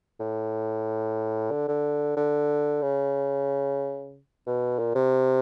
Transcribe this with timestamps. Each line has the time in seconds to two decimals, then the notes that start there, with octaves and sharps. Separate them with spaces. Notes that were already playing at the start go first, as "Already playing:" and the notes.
0.20 A2
1.51 D3
1.68 D3
2.17 D3
2.82 C#3
4.47 B2
4.79 A#2
4.95 C3